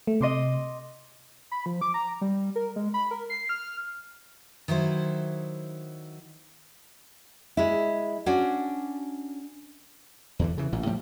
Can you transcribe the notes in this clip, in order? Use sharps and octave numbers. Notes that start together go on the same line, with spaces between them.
A3
C3 D#5 C6 D6
B5
F3
D6
A#5
G3
A#4
G#3
B5
A#4
C7
F6
D#3 F#3 E4 C5
G#3 E4
C#4 D4 F#4
E2 D3 E3
C#3 E3
A1 A#2
A2 F3 G3